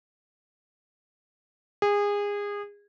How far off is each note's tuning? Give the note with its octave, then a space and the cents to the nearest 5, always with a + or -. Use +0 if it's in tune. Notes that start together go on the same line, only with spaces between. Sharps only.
G#4 -25